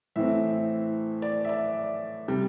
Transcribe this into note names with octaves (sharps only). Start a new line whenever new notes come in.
A2 E3 C4 E5
D5
E5
D5
C3 G3